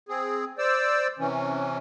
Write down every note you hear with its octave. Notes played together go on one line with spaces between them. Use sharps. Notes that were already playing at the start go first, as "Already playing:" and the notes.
C4 G#4
C5 D5 E6
C3 E3 C#4